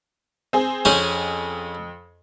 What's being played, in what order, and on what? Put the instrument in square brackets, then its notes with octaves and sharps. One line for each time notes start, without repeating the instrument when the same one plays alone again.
[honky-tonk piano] C4 G#4
[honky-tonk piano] F2 [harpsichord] C#4 G#4 C5